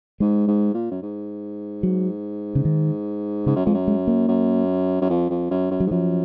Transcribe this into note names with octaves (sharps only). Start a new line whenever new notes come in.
G#2 G#3
G#2
A#2
F#2
G#2
F#3
C#3
D#3
G#2 C#3
F#2
F2 G#3
F#2
G#3
A#3
F#2
F#2
F2
F2
F#2
F#2
F#3
G#2
F#2 F3